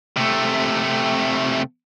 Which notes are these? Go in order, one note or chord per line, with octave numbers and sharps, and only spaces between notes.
C3 A3